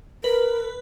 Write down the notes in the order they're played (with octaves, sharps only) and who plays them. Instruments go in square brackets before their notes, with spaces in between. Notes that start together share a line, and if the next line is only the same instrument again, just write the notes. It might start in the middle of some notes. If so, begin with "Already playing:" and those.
[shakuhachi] A#4 [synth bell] B4